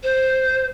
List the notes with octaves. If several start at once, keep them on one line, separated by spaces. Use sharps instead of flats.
C5